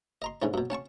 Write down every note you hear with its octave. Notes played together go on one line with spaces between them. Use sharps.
D#5 A#5 C6
G#2 D3 E3 C#4
F#2 B2
C#4 F#5 A5 C#6